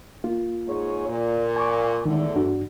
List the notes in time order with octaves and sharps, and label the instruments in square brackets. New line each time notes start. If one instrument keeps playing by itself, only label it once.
[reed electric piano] A#3 F4
[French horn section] G#2 G#4 C#5
A#2
[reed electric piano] G#5 C#6 D6
[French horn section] E2 A2 D3 [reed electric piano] D#3 G#3
[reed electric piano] G2 D4 F#4